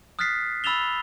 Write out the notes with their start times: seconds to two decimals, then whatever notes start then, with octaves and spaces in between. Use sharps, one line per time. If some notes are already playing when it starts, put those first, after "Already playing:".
0.19 D#6 F6 F#6 A6 B6 C7
0.64 B5 E6 A6 E7 F7 G7